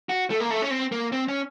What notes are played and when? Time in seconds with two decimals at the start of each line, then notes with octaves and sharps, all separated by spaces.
0.09 F#4
0.30 A3
0.40 A#3
0.50 A3
0.62 C#4
0.71 C4
0.92 A#3
1.12 C4
1.28 C#4